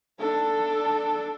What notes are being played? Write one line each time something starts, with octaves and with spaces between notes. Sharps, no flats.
D4 A4